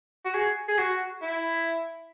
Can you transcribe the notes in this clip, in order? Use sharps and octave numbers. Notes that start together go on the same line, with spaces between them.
F#4
G#4
G#4
F#4
E4